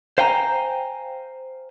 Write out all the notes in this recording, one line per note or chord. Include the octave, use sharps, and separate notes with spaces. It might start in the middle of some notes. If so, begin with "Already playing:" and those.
C5 F5 G5 G#5 A#5